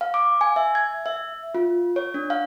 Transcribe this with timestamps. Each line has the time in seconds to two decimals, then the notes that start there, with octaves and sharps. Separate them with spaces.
0.01 F5
0.14 D6
0.41 G#5
0.56 E5
0.75 G#6
1.06 E5
1.55 F4
1.96 C#5
2.14 D4
2.30 F5